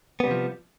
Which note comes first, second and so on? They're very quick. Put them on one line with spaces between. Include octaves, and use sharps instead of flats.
B3 G3 C3 F3